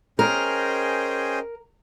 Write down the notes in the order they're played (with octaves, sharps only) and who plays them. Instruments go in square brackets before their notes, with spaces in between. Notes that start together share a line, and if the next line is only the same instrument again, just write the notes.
[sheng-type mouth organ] C#4 G#4 C5 D#5 G5 [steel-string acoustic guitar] A#4